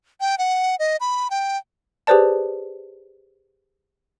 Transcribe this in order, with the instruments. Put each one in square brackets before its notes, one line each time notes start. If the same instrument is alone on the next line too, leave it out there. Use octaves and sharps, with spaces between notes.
[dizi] G5
F#5
D#5
B5
G5
[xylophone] G4 G#4 B4 C5 D5 A5